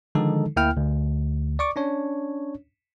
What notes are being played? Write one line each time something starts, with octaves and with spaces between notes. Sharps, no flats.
D3 D#3 F3 G#3 D#4 A4
D2 A#3 E4 G5 F6
D2
D5 C#6 D6
C#4 D4 C#5